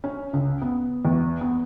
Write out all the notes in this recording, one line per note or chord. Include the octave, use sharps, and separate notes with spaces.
C#4
C#2
B3
E2
B3